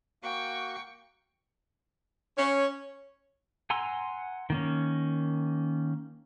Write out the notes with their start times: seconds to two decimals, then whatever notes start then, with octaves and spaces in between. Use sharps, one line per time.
0.23 A#3 F#4 G5 C#6
2.37 C#4
3.70 F#5 G#5 A#5 C6 E6
4.50 D#3 A#3 C#4